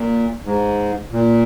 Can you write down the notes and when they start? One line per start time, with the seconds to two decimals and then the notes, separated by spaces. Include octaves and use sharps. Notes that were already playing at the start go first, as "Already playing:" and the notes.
Already playing: A#2
0.45 G#2
1.12 A#2